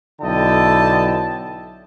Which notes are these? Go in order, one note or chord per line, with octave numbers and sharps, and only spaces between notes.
B1 D3 E4 D#5 G5 A5